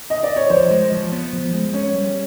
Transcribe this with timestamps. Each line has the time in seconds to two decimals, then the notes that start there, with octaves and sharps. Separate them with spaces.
0.10 D#5
0.23 D5
0.36 C#5
0.50 F3 C5
0.71 G#3
0.92 F3
1.12 B3
1.33 F3
1.53 G#3
1.73 C#4 C#5
1.94 G3